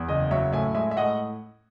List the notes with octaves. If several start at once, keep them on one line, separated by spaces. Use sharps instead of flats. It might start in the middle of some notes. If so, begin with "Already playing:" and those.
Already playing: E2
F#1 D#5
F#3 C#5 E5
A2 E5 G#5
G#3 E5 G#5
E5
A2 D#5 F#5